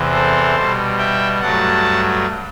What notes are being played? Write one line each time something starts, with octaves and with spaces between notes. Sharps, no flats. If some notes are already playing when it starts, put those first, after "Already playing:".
Already playing: E2 C3 E3
A4 C5
B2 G3
E5 G5
G2 F#3 A3 F#5 A5